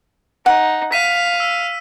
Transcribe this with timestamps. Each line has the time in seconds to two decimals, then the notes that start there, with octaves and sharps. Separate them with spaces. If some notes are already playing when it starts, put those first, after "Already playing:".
0.46 D#4 F#5
0.92 F5 B6 D#7
1.40 E6 B6